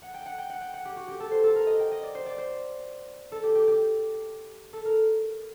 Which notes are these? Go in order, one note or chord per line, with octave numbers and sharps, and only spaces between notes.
F#5
G5
F#5
G5
F#5
G5
F#5
G4
F#4
G4
A4
C5
A4
A#4
D#5
G5
D#5
D5
C5
D5
C5
A4
G4
G4
G4
A4
A#4